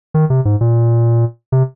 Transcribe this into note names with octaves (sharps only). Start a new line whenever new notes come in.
D#3
C3
G#2
A#2
C3